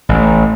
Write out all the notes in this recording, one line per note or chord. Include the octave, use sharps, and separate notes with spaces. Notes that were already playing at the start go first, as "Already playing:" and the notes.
A1